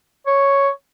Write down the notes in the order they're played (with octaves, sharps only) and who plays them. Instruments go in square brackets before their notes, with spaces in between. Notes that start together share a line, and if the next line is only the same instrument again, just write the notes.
[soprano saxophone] C#5